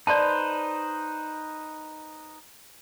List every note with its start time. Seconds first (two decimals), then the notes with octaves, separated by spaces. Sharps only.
0.07 D#4 B4 C5 D5 A5